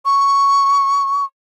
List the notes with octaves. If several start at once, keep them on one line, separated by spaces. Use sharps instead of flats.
C#6